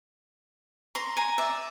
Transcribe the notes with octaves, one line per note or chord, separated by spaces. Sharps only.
A#5 C6
G#5 A#5
D5 E5